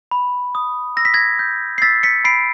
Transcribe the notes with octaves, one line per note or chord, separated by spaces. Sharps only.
B5
D#6
E6 A#6
B6
G#6 A#6
G6
C7
E6 A6 B6
B6 C#7
B5 C7 D7